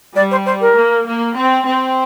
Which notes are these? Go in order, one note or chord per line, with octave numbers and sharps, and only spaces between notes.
G3 D5
C5
C5
A#4
A#3
A#3
C4
C4